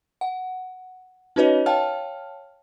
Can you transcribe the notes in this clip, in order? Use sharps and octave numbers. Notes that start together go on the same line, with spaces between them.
F#5
C#4 D#4 F#4 B4 C#5 D#5
C#5 F5 G5 A5 F6